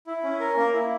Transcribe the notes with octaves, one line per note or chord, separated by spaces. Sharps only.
E4
C#4
A#4
A#3
E4